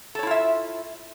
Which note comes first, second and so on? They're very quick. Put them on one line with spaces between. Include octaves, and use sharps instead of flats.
A4 C#5 E4 F4 E5